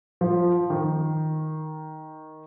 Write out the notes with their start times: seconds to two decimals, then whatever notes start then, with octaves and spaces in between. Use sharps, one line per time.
0.21 F3
0.70 D#3